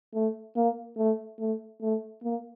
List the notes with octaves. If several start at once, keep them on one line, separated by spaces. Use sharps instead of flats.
A3
A#3
A3
A3
A3
A#3